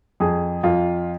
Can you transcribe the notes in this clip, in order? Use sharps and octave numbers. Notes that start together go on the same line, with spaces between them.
F2 G#4
F2 F4